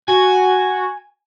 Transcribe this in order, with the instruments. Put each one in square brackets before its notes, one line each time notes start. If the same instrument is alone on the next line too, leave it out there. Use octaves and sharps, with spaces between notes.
[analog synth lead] F#4 [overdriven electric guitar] G#5